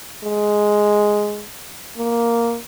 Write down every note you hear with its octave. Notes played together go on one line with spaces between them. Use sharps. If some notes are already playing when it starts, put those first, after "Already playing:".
G#3
A#3